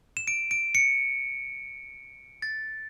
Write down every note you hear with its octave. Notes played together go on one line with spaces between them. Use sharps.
E7
D7
D7
C#7
A6